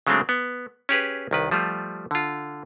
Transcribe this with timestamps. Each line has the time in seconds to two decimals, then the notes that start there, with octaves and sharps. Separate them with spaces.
0.07 C#3 F#3 G#3 A3 C4 D4
0.29 B3
0.89 C#4 G4 G#4 B4
1.31 C2 D#3 B4
1.51 F3 G3 A3 F4
2.11 D3 F4